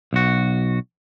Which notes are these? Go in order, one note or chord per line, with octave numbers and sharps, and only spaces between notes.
B1 F#4